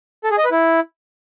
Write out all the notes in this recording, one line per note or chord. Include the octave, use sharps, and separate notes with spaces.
A4
G#4
D#5
B4
E4